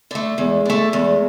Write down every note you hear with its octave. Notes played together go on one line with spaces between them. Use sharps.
D3 A3
E2 G#3
D3 A3
E2 G#3